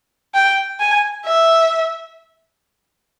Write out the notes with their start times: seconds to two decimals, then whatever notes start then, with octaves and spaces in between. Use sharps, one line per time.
0.34 G5
0.80 G#5
1.26 E5